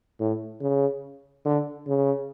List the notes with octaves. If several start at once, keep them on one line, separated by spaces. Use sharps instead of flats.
A2
C#3
D3
C#3